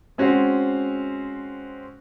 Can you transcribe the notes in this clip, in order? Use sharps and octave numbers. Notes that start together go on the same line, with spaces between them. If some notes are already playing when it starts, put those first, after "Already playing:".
G#3 C4 C#4 F#4